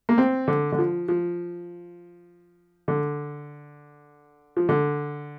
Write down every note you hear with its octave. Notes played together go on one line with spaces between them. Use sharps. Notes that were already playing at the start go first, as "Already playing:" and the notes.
A#3
C4
D3
D3
F3
F3
D3
F3
D3